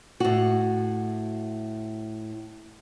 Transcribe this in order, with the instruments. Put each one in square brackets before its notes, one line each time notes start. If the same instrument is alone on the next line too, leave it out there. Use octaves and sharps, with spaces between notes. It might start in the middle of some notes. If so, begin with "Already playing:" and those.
[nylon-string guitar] A2 F#4